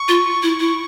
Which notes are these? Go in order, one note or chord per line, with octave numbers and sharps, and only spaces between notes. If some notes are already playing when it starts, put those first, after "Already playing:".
Already playing: C#6
F4
E4
E4